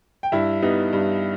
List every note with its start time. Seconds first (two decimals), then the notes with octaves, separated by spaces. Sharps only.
0.23 G5
0.32 G2 E4 E5
0.62 G3 B3 D#4
0.93 G2